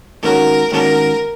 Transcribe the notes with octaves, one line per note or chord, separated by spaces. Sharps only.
G#2 D#3 A#3 C#4 F#4 A#4
G#2 D#3 A#3 C#4 F#4 A#4